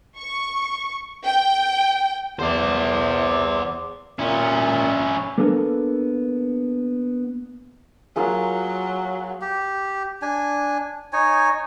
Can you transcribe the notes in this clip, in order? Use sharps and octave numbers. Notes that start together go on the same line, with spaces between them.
C#6
G5
E2 C5 D5
A#2 C#4 E4
A#3 B3 D4 A4 A#4
F#3 A#3 F4 G#4
G4
D4 G#5
D#4 C#5 G#5